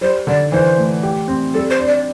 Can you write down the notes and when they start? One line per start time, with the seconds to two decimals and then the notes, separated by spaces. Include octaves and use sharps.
0.01 G3 C5
0.27 D3 D5
0.52 E3 C5
0.78 A2
1.03 G4
1.28 C4
1.54 G3 A4
1.70 C5
1.79 D4
1.87 D5